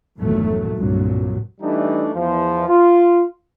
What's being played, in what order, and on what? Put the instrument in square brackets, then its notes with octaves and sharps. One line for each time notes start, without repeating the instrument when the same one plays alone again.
[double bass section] G1 E2 A#2 D#3 F#3 A3
C2 G2 A#2 F#3
[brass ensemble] E3 G3 A3 D4 D#4
E2 F3
F4